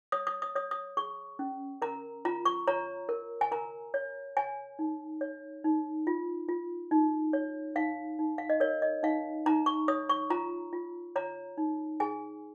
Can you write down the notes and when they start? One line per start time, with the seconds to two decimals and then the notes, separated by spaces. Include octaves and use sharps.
0.12 C#5 D#6
0.27 D#6
0.42 D#6
0.55 C#5 D#6
0.71 D#6
0.97 G#4 C#6
1.39 C#4
1.82 A#4 A#5
2.25 F4 A#5
2.45 C#6
2.68 C#5 A#5
3.09 A#4
3.41 G#5
3.52 A#4 A#5
3.94 C#5
4.37 C#5 G#5
4.79 D#4
5.21 C#5
5.64 D#4
6.07 F4
6.49 F4
6.91 D#4
7.33 C#5
7.75 D#4 F5
8.19 D#4
8.38 F5
8.50 D#5
8.60 A#4 C#5
8.82 D#5
9.03 D#4 F5
9.46 D#4 A#5
9.66 C#6
9.88 C#5 D#6
10.09 C#6
10.30 F4 A#5
10.73 F4
11.16 C#5 A#5
11.57 D#4
12.00 G#4 G#5